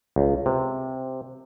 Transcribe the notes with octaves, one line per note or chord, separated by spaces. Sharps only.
C#2
C3